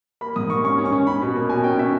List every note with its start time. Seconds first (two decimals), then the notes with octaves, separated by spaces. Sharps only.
0.21 A#3 B5
0.36 G#2 D#6
0.50 A#3 C#6
0.64 C#4 C#6
0.78 C#4
0.85 C#6
0.92 C#4
1.07 C#4 B5
1.22 B2
1.35 A#3
1.50 B2 G#5
1.64 C#4 G5
1.79 C#4 E5